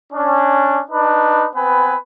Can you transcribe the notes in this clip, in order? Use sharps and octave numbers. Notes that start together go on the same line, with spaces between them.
C#4 D4
D4 D#4 B4
B3 C4 B4 G#5